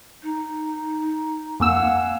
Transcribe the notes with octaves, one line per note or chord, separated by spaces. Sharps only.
D#4
F2 A#3 F5 F#5 G#5 E6